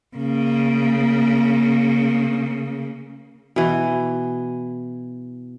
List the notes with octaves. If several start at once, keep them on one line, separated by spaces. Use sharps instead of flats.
C#3 A#3
B2 E3